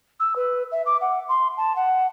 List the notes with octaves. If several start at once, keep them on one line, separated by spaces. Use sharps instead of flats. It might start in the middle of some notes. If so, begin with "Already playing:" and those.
E6
B4
E5
D6
F#5
C6
A5
F#5